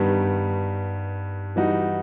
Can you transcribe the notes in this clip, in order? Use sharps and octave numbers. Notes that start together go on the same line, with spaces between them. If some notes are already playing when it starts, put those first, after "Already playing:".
Already playing: G2 D#3 G3 B3
E3 G3 D#4 F#4